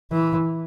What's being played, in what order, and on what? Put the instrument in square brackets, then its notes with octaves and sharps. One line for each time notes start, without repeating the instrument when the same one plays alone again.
[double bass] E3